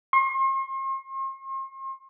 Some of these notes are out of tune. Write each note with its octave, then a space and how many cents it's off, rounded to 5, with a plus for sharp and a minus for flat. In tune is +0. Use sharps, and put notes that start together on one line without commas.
C6 +40